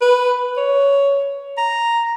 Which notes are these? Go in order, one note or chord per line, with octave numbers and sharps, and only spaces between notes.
B4
C#5
A#5